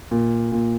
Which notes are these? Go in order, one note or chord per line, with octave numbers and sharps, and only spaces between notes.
A#2
A#2